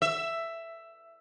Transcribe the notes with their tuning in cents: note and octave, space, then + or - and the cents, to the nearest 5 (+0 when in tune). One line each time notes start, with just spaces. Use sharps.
E5 +10